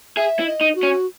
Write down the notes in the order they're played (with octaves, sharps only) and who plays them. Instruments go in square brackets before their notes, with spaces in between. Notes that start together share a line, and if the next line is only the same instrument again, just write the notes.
[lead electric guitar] G#4 [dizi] E5
[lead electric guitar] E4
[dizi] D#5
[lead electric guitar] D#4
[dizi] F#4
[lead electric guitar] C#4